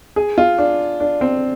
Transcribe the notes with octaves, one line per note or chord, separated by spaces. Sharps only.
G#4
F4
D4
D4
C4